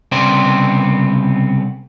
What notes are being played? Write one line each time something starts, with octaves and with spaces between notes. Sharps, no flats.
C2 C#3 B3 C4 C5 D5